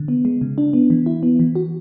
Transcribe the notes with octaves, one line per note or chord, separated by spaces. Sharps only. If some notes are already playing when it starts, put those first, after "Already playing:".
Already playing: D3
B3
G#3
C#3
D4
B3
E3
E4
B3
E3
F#4